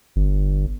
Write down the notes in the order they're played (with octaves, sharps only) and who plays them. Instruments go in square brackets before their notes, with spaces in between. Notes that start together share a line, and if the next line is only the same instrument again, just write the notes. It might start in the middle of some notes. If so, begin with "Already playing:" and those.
[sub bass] G1